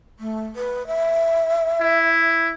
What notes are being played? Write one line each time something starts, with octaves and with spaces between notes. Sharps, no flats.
A3
B4
E5
E4